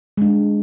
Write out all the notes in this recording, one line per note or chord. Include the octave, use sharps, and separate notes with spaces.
G#3 D4